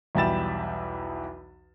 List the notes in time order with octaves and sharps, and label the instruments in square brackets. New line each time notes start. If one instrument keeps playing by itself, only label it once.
[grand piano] B1 E2 G3 E5 A6 E7